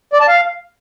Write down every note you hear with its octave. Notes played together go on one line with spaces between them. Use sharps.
D5
A5
F5